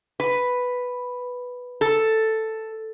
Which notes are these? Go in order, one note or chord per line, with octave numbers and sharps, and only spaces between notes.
B4
A4